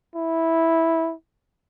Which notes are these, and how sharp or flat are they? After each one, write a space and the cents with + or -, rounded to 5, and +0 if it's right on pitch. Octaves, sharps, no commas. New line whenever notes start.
E4 -10